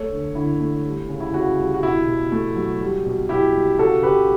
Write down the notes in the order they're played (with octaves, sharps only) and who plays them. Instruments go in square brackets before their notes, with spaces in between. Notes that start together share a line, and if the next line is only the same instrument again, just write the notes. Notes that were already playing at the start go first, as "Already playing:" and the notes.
Already playing: [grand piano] A3 A4 C#5
D3
D3 E4
A3
G3
C#3
E4
C#3 F#4
G3
F#4
B2 E4
B2
A3
F#3
G3
B2
B2 E4 G4
G3
C#3 F#4 A4
C#3 G4 B4